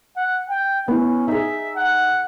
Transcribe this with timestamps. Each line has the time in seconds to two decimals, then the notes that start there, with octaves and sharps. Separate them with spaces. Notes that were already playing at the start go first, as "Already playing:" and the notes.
0.16 F#5
0.50 G5
0.88 B3 C#4 E4
1.28 D#4 G#4 E5
1.76 F#5